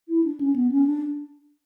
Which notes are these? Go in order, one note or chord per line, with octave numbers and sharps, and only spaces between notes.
E4
D4
C#4
B3
C#4
D4